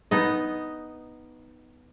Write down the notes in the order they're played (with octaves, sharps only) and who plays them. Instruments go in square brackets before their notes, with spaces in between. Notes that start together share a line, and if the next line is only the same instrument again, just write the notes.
[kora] B3 D#4 D#5